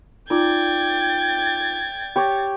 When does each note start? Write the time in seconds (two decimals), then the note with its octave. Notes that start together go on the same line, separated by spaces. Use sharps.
0.30 D#4 F4 D5 G5 G#6 A6
2.16 G4 C#5